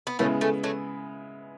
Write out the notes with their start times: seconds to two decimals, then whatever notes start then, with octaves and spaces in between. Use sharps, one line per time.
0.07 B3
0.19 C#3 G#3 A3 B3 C#4 E4
0.41 A3 C#4
0.64 F#3 A3